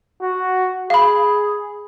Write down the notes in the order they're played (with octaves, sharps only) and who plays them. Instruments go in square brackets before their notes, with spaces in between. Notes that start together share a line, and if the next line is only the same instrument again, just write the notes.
[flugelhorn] F#4
[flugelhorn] G#4 [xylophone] F5 B5